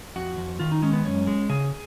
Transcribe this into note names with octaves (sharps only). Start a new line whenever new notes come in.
F2 F#4
F2
D#3 F4
D#4
G#3 C#4
B3
F#2 C#4
G#3
C#3 G#4